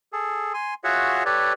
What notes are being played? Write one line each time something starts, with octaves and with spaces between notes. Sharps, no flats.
G#4 A4
G#5 C6
F4 F#4 G#4 C#5 E5 F#5
G4 A4 B4 C#5 D5